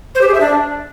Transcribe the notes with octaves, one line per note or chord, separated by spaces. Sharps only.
C5
G4
G#4
E5
D4